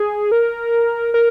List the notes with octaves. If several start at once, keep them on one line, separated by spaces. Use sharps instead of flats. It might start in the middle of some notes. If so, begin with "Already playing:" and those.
Already playing: G#4
A#4
A#4